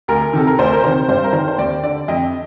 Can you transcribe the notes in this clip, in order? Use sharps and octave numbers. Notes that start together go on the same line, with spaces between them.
D2 A#4
C3 D#3 A4
A#4
D2 C5
A#4
C3 D#3 C5
G2 C5
A#4
D#3 C5
C5
D#2 D5
D3 D5
F2 D#5